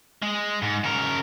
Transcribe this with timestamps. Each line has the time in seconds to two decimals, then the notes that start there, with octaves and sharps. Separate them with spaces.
0.22 G#3
0.62 G#2
0.84 C#3 A#4